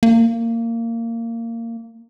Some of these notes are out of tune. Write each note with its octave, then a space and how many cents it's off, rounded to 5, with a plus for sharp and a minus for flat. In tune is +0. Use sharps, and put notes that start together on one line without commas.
A#3 -20